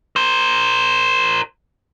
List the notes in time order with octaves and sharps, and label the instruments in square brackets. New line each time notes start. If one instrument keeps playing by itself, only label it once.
[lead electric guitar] A#4 C5